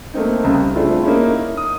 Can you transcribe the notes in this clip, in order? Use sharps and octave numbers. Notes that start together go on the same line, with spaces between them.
A3 A#3 C4 D#4
C2 C#3
A3 C4 D4 E4 F4 G#4
A#3 C#4 D#4 E4
D#4
D#6